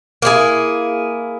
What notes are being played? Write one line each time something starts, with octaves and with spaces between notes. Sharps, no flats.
A#3 E4 G#4